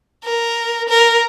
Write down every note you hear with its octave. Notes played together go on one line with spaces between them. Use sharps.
A#4
A#4